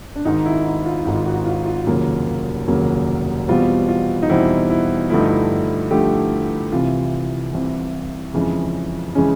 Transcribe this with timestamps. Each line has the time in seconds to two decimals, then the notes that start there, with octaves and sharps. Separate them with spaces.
0.16 D4
0.25 G#1 G#2 D#3 D#4
0.46 E4
0.65 E4
0.86 F4
1.05 G#1 G#2 D#3 F4
1.16 F4
1.26 F#4
1.46 F4
1.66 F4
1.86 F1 D#2 C#3 F#3 A#3
2.67 F1 D#2 C#3 F#3 A#3
3.48 E2 B2 G3 C4 F4
3.89 F4
4.22 D#4
4.29 E2 B2 G3 C4 E4
4.70 E4
5.10 G2 D3 F3 A3 E4
5.19 D#4
5.28 E4
5.91 G2 D3 F3 A3 G4
6.72 C2 C3 E3 F4
7.53 C2 C3 E3
8.34 F2 C#3 E3 G#3 C#4
9.15 C#3 E3 G#3 C#4